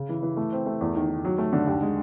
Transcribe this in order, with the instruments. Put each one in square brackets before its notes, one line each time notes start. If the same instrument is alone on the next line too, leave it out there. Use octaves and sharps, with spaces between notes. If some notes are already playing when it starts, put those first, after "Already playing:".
Already playing: [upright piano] C#3
E3
E3
A3
C4
A3
E2
D#3
D#3
F#3
A3
D3
D#2
G#3